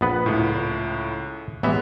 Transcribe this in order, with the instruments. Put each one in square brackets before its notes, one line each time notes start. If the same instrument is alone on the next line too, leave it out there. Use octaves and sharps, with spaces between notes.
[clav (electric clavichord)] A#1 B3 B4
[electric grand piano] C#2 A2
[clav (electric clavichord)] A1 E3 E5 [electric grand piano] G#3 B3